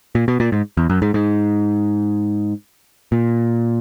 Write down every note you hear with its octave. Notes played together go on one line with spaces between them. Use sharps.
A#2
B2
A#2
G#2
E2
F#2
G#2
G#2
A#2